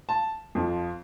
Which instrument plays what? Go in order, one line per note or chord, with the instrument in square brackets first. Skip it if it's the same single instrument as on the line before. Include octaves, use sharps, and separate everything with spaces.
[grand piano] A5
F2 F3